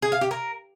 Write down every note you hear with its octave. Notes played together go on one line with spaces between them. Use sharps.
G#4
F5
G4
A#4